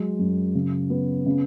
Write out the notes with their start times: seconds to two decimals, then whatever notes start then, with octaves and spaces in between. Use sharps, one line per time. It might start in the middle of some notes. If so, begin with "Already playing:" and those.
Already playing: F#3 G#3
0.19 F#2
0.55 C#3
0.90 B3
1.26 C#3